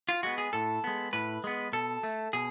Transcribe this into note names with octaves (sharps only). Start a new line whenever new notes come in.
F4
G#3 B3 F#4
G#4
A2 A4
G#3 B3
A2 B4
G#3 B3
B2 A4
A3
B2 G#4